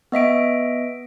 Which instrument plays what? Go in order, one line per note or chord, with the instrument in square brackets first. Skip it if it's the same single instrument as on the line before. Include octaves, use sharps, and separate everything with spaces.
[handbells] B3 D#5 E5 D7